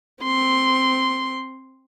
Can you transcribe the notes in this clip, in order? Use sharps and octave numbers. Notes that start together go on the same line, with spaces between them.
C4 C6